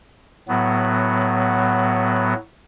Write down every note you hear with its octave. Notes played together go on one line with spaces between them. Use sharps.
A2 F#3 B3